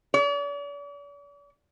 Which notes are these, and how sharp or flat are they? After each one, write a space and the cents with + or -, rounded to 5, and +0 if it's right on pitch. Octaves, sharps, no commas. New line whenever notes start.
D5 -45